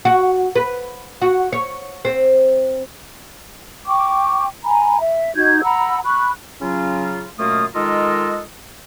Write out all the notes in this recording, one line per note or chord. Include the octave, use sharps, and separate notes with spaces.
F#4
B4
F#4
C#5
C4
G5 C#6 D6
G#5 A#5 B5
E5
D#4 F#4 G6 G#6
F#5 A#5 B5 E6
B5 C#6 F#6
C#3 F#3 C#4 F4
F#2 B2 A3 A#3 F4 D#6
D#3 G#3 F4 A4 A#4 D#5